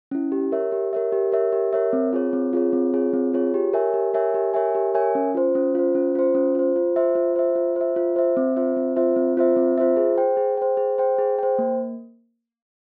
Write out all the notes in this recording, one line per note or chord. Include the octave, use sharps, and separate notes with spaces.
C#4 E4
G4
A#4 C#5 E5
G4
A#4 C#5 E5
G4
A#4 C#5 E5
G4
A#4 C#5 E5
C4
F4 G#4 C#5
C4
F4 G#4 C#5
C4
F4 G#4 C#5
C4
F4 G#4 C#5
G4
A#4 C#5 E5 G#5
G4
A#4 C#5 E5 G#5
G4
A#4 C#5 E5 G#5
G4
A#4 C#5 E5 G#5
C#4
F4 C5
C#4
F4 C5
C#4
F4 C5
C#4
F4 C5
F4
C5 E5
F4
C5 E5
F4
C5 E5
F4
C5 E5
C4
F4 C5 E5
C4
F4 C5 E5
C4
F4 C5 E5
C4
F4 C5 E5
G#4
C5 G5
G#4
C5 G5
G#4
C5 G5
G#4
C5 G5
A#3